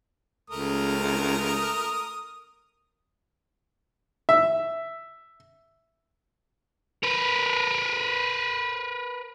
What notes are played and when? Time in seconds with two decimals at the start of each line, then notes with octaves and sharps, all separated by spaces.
0.50 C#2 A3 A#4 D#6
4.29 E5
7.03 A#4 B4